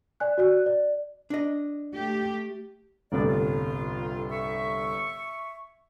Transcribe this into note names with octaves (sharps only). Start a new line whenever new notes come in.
D5 G#5 F#6
F#4 D5 F#6
D5
D4 D#5
A3 G4
G1 C2 A2 D5
F4
E5 C#6